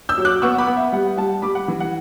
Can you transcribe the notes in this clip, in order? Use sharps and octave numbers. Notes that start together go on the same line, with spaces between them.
E6 G6
F#3
D6 F#6
B3 C#6 E6
B5 D6
B3
E5
G3 F#5
G3 F#5 A5
G3 B5 D6
F#5
E3
F#5